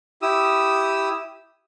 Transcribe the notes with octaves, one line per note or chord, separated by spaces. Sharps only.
E4 G4 D#6 E6